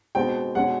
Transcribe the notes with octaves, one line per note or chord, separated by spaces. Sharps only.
B2 G#3 C4 G5
B2 G#3 C#4 F#5